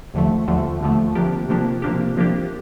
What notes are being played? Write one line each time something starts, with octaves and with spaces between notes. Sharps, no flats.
D#2 D3 F3 A3
D#2 D3 F3 A3
D#2 D3 F3 A3
C3 F3 A#3 D4 G4
C3 F3 A#3 D4 G4
C3 F3 A#3 D4 G4
C3 F3 A#3 D4 G4